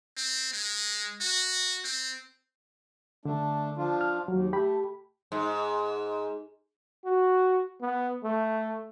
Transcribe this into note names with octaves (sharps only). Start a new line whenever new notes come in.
C4
G#3
F#4
C4
D3 A3 D4
F3 D4 F4
F6
D#2 F#3
A3 G4 B5
G#2
F#4
B3
A3